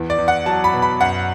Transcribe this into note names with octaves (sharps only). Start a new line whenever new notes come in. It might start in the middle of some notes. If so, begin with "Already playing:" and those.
Already playing: E2 E3
D5
E2
F#5
F#3 A5
B5
B2
B5
F#2 F#5